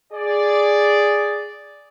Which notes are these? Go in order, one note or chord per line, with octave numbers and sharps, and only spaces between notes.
G#4 D5